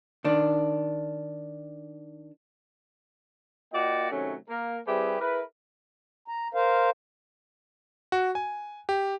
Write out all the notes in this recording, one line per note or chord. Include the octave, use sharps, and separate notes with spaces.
D#3 D4
A#3 F4 F#4 D5 D#5 G5
C3 D#3 F#3 A3 C#4
A#3 A#4
G3 C4 E4 G4 G#4 B4
E4 G#4 A#4 B4
A#5
A#4 C5 F5
F#4
G#5
G4